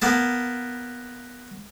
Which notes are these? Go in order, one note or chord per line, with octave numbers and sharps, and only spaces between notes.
A#3 B3 A5